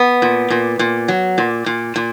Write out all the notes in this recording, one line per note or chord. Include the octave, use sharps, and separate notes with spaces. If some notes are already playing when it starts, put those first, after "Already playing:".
Already playing: B3
A#2
A#2
A#2
F#3
A#2
A#2
A#2